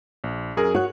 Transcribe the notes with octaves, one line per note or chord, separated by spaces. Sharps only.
A#1
F#2 G#4 A#4
F#4 C#5 F#6